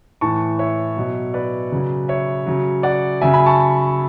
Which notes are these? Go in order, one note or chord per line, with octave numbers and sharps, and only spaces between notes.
A2 E3 A5 C#6
C#5 E5
B2 F#3
B4 D5
C#3 F#3
C#5 E5
C#3 F#3
D5 F#5
C#3 F#3 E5 G#5
G#5 B5
A5 C#6